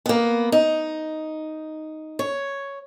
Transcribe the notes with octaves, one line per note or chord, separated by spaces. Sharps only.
A#3 B3
D#4
C#5